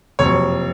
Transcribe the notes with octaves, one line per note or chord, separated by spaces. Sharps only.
F#1 F2 C3 F#3 C#5